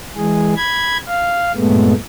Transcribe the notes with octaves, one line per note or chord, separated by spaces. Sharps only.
E3 G#3 G#4
B5 G#6
F5
G2 A#2 G#3 A3 B3